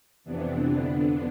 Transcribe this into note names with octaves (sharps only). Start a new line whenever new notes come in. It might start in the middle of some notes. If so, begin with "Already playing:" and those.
F2 C3 E3 B3 D4
F2 D3 B3 D4